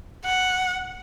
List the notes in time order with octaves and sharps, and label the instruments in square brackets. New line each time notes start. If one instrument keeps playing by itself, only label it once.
[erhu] F#5